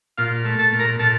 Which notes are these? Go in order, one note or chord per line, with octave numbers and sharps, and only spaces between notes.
A#2 F4 F5
A3
A4 A5
A#2
A#4 A#5
A#2 A4 A5